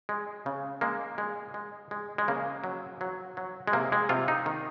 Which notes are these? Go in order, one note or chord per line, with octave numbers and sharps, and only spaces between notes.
G#3
C#3
G#3 A#3
G#3
G#3
G#3
G#3
C#3 A#3
F#3
F#3
F#3
G#3
C3 A#3
G#3
C3 F4
D#4
D#3